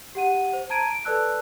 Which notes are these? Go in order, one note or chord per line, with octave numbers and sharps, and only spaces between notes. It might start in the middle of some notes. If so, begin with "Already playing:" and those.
G4 F#5 D#7
C5
A5 A#5 G#6 D7 D#7
D7
A4 B4 D5 A5 E6 F#6